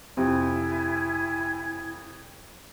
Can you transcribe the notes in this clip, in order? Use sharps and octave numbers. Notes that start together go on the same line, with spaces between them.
F2 C3 E4 G#5 G#6